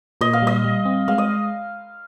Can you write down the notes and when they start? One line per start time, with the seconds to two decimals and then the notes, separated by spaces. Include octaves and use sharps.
0.21 A#2 D#5
0.33 F5
0.42 G3 D#5
0.64 G3
0.85 C4
1.08 G#3 F5
1.18 D#5